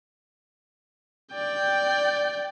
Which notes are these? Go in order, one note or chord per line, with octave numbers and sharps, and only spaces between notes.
D5 G5